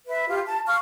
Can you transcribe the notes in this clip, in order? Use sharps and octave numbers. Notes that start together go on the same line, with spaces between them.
B4 E5
F4 G4
A5
F5 C#6 F6